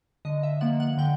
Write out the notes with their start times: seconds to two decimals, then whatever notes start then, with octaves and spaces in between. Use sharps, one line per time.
0.25 D3 D#5
0.43 E5
0.61 F3 A#3 F#5
0.80 F#5
0.98 D3 G5